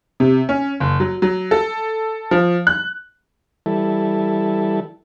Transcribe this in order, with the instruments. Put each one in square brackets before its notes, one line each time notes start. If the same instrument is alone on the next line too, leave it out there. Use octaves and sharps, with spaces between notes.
[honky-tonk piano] C3
C#4
F#1
F#3
F#3
A4
F3
F#6
[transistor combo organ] E3 G3 E4 A4